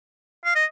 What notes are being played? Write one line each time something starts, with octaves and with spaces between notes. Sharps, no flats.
F5
D#5